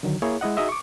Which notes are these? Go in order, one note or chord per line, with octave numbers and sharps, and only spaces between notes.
D3 D#3 F#3
A#3 E4 G#4 C#5
G#3 E4 D#5 F#5
D#4 F#4 G#4 D#5 E5
C#6 D6